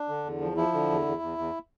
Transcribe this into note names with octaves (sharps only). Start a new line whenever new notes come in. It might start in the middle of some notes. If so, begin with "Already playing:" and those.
Already playing: D4
D3
E2
F3
F3 E4
D3
E2
E2
E2
E2